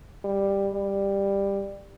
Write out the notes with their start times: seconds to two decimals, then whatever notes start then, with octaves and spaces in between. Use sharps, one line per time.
0.24 G3
0.73 G3